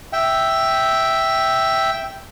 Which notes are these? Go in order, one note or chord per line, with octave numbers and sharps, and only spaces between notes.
E5 G5